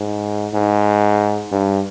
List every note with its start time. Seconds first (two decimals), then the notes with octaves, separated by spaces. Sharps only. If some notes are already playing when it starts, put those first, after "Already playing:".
Already playing: G#2
0.54 G#2
1.52 G2